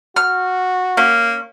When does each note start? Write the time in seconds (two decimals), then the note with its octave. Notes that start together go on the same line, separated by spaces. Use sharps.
0.16 F#4 F6
0.97 A#3 C#4